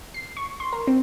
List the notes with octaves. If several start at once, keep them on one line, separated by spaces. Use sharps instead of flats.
C7
C#6
C6
A#4
C4